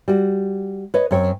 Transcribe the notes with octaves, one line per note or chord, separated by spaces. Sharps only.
G3 F#4
B4 C#5 D#5
F#2 C4 C#5 G5